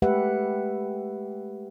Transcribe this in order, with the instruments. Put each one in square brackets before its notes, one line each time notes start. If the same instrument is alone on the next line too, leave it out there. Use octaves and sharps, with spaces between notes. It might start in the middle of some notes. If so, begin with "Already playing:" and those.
[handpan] G#3 A3 G4 B4 E5 F#5